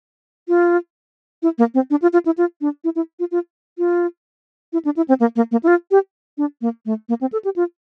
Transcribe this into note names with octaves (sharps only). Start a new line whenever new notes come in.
F4
E4
A#3
C4
D4
F4
F4
E4
F4
D4
E4
E4
F4
F4
F4
E4
D4
E4
C4
A#3
A#3
A#3
E4
F4
G4
D4
A#3
A3
A#3
C4
A4
G4
F4